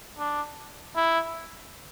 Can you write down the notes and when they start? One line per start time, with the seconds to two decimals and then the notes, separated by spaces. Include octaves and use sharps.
0.19 D4
0.96 E4